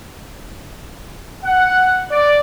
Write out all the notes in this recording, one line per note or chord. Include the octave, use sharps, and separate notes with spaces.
F#5
D5